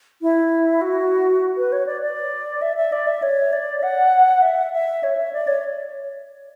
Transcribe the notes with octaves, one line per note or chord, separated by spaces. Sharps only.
E4
F#4
B4
C#5
D5
D5
E5
E5
D5
E5
C#5
D5
F#5
E5
E5
C#5
E5
D5
C#5